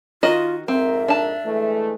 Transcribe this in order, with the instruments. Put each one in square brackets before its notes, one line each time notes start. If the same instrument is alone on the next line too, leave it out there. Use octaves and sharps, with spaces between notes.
[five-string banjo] D#3 F#4 D#5 [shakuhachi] F4
[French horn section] F2 G#2 A#4 [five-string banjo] C4 [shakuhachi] E5
[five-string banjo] D4 A5
[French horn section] E3 G#3 A3